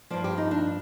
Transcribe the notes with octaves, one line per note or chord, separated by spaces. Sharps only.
G2 F3 D5
G4
D#4
D4